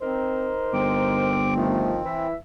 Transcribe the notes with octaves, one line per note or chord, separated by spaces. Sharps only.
C4 D#4 A#4 C5
G1 C4 D6
D#3 F3 A3
E3 E5